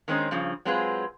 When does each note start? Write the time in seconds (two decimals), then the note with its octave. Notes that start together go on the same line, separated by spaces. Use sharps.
0.08 D#3 G#3 C4 C#4 D#4
0.31 G2 C#3 F3
0.65 F#3 G#3 C4 F4 G#4 B4